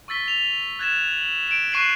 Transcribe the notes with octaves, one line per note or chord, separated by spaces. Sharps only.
C#6 E6 A6 B6 G7
F7
F#6 G#6 A6 E7
F#7
D7 E7
C#6 F#6 C7 D#7 E7 F#7